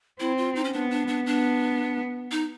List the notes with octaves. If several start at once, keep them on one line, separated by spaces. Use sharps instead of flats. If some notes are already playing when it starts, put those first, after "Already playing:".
C4 E4
F4
D#4
C#4
B3 D4
D4
D4
B3 D4
D#4